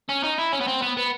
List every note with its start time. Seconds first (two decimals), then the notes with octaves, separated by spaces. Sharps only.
0.09 C#4
0.23 D#4
0.38 E4
0.53 C#4
0.61 B3
0.68 C4
0.82 B3
0.97 B3